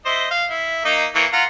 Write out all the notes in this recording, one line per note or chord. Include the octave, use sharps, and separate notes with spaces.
E4 C5 D#5
F5
E4
A#3 D#4 D#5
E3 A#3 C#5
F4 F#5 A#5